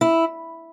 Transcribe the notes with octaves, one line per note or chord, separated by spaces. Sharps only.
E4